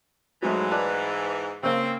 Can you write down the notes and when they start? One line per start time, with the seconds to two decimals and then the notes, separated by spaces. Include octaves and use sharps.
0.43 G#2 E3 F#3 G#3 A3
0.71 B4 D5 A5
1.63 C#3 A#3 C4 E6